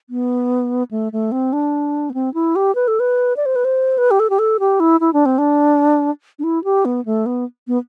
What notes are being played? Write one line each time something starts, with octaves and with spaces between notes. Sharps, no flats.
B3
A3
A3
C4
D4
B3
C4
E4
G4
B4
A4
B4
D5
C5
B4
C5
B4
G4
A4
G4
A4
G4
E4
E4
D4
C4
D4
D4
E4
G4
B3
A3
B3
B3